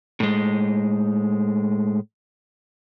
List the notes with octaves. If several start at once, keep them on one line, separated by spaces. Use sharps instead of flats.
A2 G#3